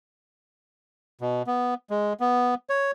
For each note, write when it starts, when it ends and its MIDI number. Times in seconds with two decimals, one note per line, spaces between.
1.21 1.43 47
1.47 1.74 59
1.90 2.13 56
2.20 2.55 59
2.70 2.91 73